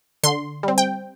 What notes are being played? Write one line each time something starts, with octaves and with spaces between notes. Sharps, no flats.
D3 C6
G3 C4
G5